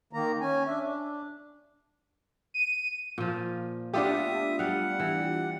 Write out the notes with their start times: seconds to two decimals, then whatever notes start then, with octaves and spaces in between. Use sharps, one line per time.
0.13 D#3 A#3 A#5
0.41 C#4 G#5
0.67 D4 E5
0.85 D4
2.54 D#7
3.18 A#2 F3
3.94 A3 B3 D4 F4 G4 E5 D#6
4.59 G3 F5 F#5
5.00 E3